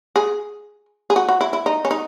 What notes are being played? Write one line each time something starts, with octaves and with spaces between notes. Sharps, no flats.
G#4
G#4
F#4
F#4
E4
E4
D#4
C#4
D#4